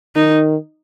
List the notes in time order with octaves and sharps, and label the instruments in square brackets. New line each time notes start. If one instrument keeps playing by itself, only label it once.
[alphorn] D#3 [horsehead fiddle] D#4